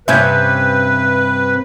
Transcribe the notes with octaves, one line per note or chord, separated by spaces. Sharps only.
G2 C3 C#4 B4 E5 G6 G#6